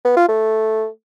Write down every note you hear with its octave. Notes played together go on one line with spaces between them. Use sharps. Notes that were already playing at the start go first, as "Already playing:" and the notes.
B3
F4
A3